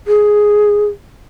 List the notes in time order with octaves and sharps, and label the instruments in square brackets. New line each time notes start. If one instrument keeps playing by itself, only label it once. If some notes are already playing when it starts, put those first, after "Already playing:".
[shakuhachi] G#4